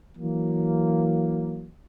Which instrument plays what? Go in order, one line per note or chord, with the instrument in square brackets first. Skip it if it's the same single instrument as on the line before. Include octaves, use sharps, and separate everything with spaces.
[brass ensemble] E3 F#3 A#3